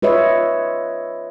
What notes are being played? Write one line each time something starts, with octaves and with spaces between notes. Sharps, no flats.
F4 B4 C#5 D#5 E5